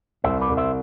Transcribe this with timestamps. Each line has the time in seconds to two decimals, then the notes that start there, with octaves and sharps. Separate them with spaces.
0.24 C2 C5 E5
0.41 B4 D5
0.49 C2
0.57 C5 E5